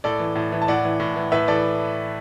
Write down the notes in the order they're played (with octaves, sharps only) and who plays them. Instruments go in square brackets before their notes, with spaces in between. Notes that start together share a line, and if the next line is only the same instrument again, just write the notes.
[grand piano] A2 A4 D5
E3
A2
E3
A5
A2 D5 F#5
E3
A2
E3
A2 B4 E5
E3 A4 D5